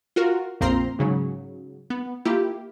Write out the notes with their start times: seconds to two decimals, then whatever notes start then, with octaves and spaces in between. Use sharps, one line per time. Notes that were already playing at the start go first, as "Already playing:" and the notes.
0.16 F4 F#4 A#4
0.61 A#1 F2 A#3 C4 A#5 C6
0.99 G#2 C#3 F#3
1.90 B3
2.25 A#3 E4 F4 G4